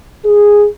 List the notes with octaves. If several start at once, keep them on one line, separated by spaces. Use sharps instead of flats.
G#4